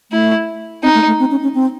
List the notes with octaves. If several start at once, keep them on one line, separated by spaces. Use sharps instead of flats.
A3 E4
C4 D#4
A3
A3
C4
C#4
C#4
C4